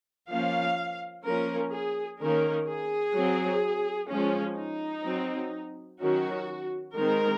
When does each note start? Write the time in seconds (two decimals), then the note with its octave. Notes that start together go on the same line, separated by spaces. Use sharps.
0.30 F3 A#3 C#4 F5
1.25 F3 A#3 C#4 A#4
1.72 G#4
2.20 D#3 A#3 C#4 A#4
2.67 G#4
3.15 F#3 C4
4.10 F3 G#3 C#4
4.57 D#4
5.05 F#3 C4
6.00 D#3 F#3 C#4 F#4
6.95 D#3 G#3 C4 A#4